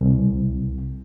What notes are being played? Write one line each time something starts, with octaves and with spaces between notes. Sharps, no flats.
C2